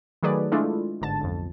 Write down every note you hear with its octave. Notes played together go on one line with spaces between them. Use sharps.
D#3 F#3 A3 G#4 B4 D5
G#3 A3 D4 E4 F4 A4
G1 G#2 D3 A5 A6
B1 F2